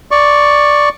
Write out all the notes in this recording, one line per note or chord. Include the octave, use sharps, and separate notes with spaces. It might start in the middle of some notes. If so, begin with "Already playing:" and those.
D5 C#6